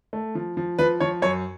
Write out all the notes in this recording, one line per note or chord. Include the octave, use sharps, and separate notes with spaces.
A3
F3
F3
F3 B4
F3 C#5
F#2 C#5